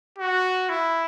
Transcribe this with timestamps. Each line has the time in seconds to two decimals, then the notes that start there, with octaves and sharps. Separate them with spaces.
0.19 F#4
0.69 E4